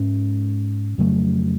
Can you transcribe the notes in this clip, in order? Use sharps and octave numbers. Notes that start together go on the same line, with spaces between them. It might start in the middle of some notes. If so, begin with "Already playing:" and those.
Already playing: G#2 G#3 C#4
F2 C#3 F#3 A3